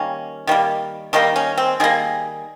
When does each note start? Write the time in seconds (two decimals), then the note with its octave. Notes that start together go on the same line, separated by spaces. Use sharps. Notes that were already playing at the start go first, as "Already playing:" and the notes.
Already playing: D#3 G3 A#3 C#4
0.47 D#3 G3 A#3
1.13 D#3 G3 A#3 D#4
1.36 C#4
1.57 C4
1.80 D#3 G3 A#3 G#4